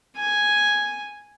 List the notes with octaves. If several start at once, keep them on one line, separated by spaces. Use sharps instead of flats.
G#5